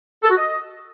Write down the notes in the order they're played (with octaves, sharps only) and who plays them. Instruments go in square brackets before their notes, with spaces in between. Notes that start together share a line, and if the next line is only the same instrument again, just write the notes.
[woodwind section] A4
F#4
D#5